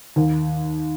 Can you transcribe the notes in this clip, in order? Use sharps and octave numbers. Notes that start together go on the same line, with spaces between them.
D#2 D#3